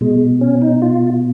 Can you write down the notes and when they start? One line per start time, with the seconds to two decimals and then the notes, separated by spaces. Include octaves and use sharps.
0.01 B2 G#3
0.41 C#4
0.62 D#4
0.82 F4